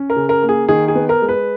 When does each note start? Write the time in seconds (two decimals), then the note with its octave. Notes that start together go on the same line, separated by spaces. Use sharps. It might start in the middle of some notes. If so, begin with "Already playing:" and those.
Already playing: C#4
0.10 A#4
0.16 C#3
0.29 A#4
0.43 A#3
0.49 G#4
0.68 D#3 G#4
0.88 G#4
0.95 B3
1.09 A#4
1.22 G#3
1.29 B4